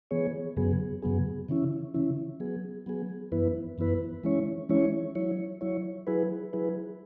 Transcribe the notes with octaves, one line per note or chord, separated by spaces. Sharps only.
E3 B3 G#4 C#5
F#2 C#3 F#3 B3 G#4
F#2 C#3 F#3 B3 G#4
C#3 E3 C#4 E4
C#3 E3 C#4 E4
F#3 B3 G#4
F#3 B3 G#4
F#2 E3 B3 E4 B4
F#2 E3 B3 E4 B4
E3 G#3 C#4 E4 C#5
E3 G#3 C#4 E4 C#5
F#3 E4 C#5
F#3 E4 C#5
F#3 E4 G#4 B4
F#3 E4 G#4 B4